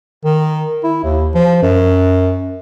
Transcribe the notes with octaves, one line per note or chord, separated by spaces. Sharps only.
D#3
E4
D#2
F3
F#2